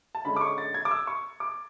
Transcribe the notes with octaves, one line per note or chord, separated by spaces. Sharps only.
A5
D3 G#3 C#4 B5
D6
C#6
A6
G#6
D6
E6
C#6
D6